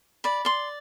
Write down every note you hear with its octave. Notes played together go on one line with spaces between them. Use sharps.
D5 B5
D5 C6